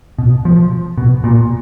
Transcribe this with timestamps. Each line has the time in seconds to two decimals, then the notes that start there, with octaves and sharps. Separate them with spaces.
0.18 B2
0.45 F3
0.98 B2
1.24 A#2